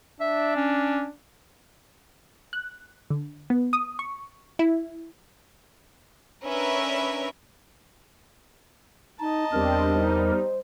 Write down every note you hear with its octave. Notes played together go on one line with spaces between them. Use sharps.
D4 E5
C#4
F#6
D3
B3
D#6
C#6
E4
C#4 D4 A#4 B4 E5
D#4 D#5 A5
E2 G3 C4 D4 A#4
G3 D#4 C5